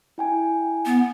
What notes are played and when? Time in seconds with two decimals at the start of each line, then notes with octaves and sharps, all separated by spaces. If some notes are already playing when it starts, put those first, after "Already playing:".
0.18 E4 G5 G#5
0.86 B3